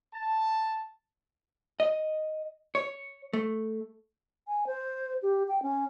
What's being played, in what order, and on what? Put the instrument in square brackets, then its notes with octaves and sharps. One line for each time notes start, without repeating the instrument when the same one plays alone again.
[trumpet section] A5
[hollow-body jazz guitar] D#5
C#5
A3
[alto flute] G#5
C5
G4
G5
C#4